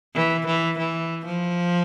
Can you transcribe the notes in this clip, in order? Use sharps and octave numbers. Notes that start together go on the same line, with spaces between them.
E3
E3
E3
F3